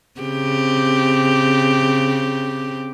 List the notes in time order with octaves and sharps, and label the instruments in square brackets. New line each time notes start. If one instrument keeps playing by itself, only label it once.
[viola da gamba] C#3 C4 G4